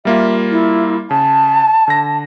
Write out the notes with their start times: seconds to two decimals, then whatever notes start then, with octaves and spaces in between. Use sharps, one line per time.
0.05 G3 A#3 F4 E5
0.51 E4
1.11 C#3 A5
1.88 D3 A#6